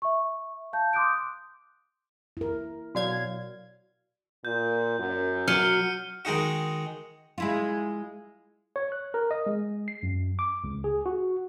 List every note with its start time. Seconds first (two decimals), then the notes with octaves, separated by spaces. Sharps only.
0.02 E5 C#6
0.73 F5 A5 G6
0.93 C6 D6 D#6 F#6 G6 D7
2.37 E4 A#4
2.95 B2 F#3 F#4 C#5 D5 F5 G#6
4.45 A#2 G6
4.99 F#2
5.48 F#3 F6 C#7 D#7
6.25 D#3 G#3 D#4 F#4
7.38 G#3 E4 F4
8.76 C#5
8.92 F#6
9.14 A#4
9.31 D#5
9.46 G#3
9.88 C7
10.03 F#2
10.39 D6
10.64 C#2
10.84 G#4
11.06 F#4